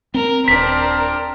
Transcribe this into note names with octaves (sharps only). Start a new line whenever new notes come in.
C4 A#4
D#1 C4 D4 A#4 B6